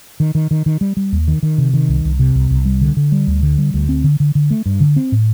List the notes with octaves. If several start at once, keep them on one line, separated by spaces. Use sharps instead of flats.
D#3
D#3
D#3
D#3
G3
G3
D#2
D#3
D#3
C3
D#3
C2
C2
C3
C2
C2
G3
D3
D3
G3
D2
D3
G3
D2
C4
D3
D3
D3
A3
G2
D3
C4
A2